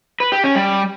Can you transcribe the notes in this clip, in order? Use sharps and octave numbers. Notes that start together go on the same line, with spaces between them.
B4
G4
C#4
G3